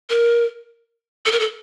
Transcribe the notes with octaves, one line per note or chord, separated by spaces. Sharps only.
A#4
A4
A#4
A4